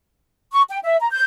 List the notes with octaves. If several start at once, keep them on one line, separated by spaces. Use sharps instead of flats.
C#6
G5
E5
A#5
G6